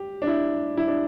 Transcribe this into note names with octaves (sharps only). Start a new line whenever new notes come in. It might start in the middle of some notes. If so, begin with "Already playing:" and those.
Already playing: G4
D4
E4
E4
D4